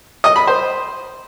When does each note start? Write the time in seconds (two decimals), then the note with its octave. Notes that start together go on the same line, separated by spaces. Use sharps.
0.24 D#5
0.36 B5
0.47 C5